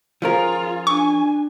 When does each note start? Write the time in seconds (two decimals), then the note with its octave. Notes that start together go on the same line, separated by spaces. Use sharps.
0.22 F3 C#4 F4 G#4 A#4
0.87 D4 G#5 C#6